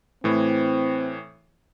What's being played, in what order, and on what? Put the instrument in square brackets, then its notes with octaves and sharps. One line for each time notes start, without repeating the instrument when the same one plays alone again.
[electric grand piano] A2 E3 [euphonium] C4